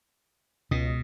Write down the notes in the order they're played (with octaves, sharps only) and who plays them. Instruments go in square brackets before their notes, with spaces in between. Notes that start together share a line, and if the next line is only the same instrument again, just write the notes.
[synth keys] C#2 D#5 D#6 [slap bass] B2